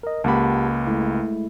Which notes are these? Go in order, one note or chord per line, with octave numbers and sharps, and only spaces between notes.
A#4 D#5
C#2 A#3 G4 F#5 A5 B5
G#3 A3 E4